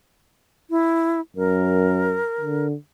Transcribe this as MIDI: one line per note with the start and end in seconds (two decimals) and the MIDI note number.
0.70 1.20 64
1.36 2.20 42
1.36 2.67 70
2.41 2.75 50